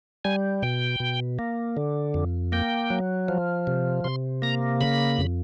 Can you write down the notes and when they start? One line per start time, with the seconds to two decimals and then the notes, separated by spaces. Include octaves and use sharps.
0.25 G3 G#5
0.62 B2 G5
1.00 B2
1.39 A#3
1.77 D3
2.14 F2
2.52 A#3 G5
2.90 F#3
3.28 F3
3.67 C3
4.04 C3 C6
4.42 A#3 A#5
4.81 C#3 B5
5.18 F2